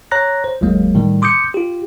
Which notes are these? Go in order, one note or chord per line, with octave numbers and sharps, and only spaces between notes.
C#5 A#5 F#6 A#6
C5
G1 D#2 F#3 G#3 A#3
A2 D#3 G3
C6 D6 D#6 G6 C#7
F4 G4